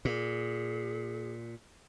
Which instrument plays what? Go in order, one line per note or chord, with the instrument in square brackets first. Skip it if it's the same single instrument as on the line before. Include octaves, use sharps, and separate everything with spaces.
[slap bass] A#2 [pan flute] G#4